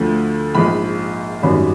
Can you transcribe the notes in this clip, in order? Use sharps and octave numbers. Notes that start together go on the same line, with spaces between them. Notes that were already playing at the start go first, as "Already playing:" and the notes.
Already playing: D2 D3 F3 A3
A#1 G#2 F3 B5
G#1 F#2 D#3 G3 B5